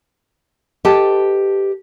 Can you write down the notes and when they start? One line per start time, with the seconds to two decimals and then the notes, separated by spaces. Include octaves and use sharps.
0.85 G4 A4 B4 D#5 G5 A5